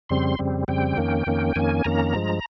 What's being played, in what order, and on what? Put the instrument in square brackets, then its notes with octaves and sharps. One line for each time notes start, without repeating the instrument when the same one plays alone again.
[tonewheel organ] F2 C#3 G3 C4 C6
F2 C#3 G3 C4
F2 C#3 G3 C4 G5
F2 D#3 A#3 C#4
F2 D#3 A#3 C#4
F2 D#3 A#3 C#4 G#5
F2 D#3 A#3 C#4 A#5
G2 F3 G#3